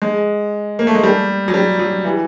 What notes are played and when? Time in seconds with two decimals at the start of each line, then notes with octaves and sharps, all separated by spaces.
0.02 G#3
0.79 A#3
0.87 A3
0.95 G#3
1.04 G3
1.48 F#3
1.54 G3
1.79 F#3
2.05 E3